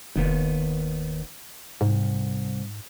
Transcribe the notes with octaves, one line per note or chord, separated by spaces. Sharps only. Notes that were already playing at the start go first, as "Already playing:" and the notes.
F1 D#2 D#3 B3
C2 G#2